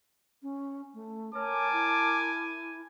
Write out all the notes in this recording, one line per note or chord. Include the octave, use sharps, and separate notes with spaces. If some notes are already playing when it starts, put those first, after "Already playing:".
C#4
A3
A#4 C#5 G#5 A5 D6
E4